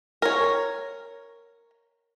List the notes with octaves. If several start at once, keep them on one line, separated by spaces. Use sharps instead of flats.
A#4 C#5